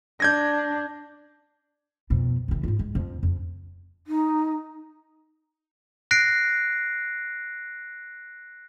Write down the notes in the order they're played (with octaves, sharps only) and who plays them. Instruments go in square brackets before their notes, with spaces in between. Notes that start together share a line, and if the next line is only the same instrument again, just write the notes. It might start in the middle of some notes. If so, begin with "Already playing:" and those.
[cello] D4 [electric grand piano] G6 G#6 A#6
[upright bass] F2 B2
F#1 E3
G#2 F4
G#3
F2
F2
[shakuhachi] D#4
[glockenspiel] F#6 A#6 C7 D7